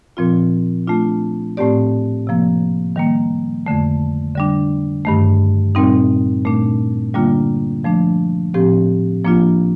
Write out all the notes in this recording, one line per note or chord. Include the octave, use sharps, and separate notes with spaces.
A#2 F3 C4 F4
A3 D4 F4
A2 A3 C4 G4 D5
C3 F3 A#3
D#3 G3 A#3
F2 D3 A3
D3 G3 D4
G2 D#3 A3
A#2 G3 C4 D#4
A#2 A3 D4
D3 G3 A#3 D4 F4
F3 A3 D4
A2 F3 C4 G4
F3 A#3 D4 F4